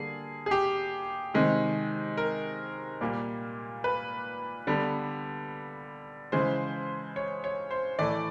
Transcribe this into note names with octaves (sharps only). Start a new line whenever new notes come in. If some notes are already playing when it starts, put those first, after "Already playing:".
Already playing: D3 G3 A#3 G#4
G#4
G4
C3 D#3 G#3
A#4
A#2 G3 A#3
B4
D3 G3 B3
C#3 E3 G#3 C5
C#5
C#5
C5
A2 E3 A3 D5